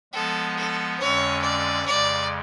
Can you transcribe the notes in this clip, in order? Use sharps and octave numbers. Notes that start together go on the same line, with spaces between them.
F3 G#3 B3 A4
A4
F2 D3 G#3 C#4 C#5
D5
F2 C#3 G#3 D5